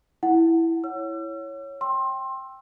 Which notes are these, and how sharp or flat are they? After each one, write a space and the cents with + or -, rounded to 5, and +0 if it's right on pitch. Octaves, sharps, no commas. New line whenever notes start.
E4 +0 F#5 +0
C#5 +0 E6 +40
G5 +0 C6 +20 E6 +5